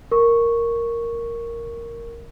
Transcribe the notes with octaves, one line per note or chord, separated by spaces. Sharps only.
A#4 C#6